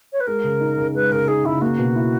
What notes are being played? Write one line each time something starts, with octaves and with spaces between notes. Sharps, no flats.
C#5
B4
G#3 A#4
C#3
D#4
C#3
G#3 B4
C#3 A#4
D#4 G#4
C#3 E4
A#3 F#4
B2
E4